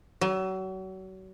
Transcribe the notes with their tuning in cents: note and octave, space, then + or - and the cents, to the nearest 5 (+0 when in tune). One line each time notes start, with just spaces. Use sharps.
F#3 +35